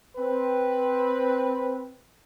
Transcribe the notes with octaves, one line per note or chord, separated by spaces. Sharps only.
C4 B4